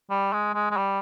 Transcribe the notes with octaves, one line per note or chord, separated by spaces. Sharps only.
G3
G#3
G#3
G#3
G3